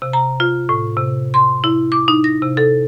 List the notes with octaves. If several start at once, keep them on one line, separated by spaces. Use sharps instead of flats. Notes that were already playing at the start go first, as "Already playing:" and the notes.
C3
A#5
F4
A2
C3
C6
E4
D6
D#4
A#6
C3
A4